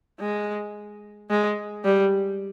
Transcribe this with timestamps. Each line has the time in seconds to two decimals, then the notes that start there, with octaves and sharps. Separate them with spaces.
0.20 G#3
1.30 G#3
1.85 G3